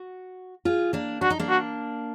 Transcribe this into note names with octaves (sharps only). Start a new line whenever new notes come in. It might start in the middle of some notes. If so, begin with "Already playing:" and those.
Already playing: F#4
F4 G#4
A#3 D4
D4 F#4
D#4
A#3 D4
F#4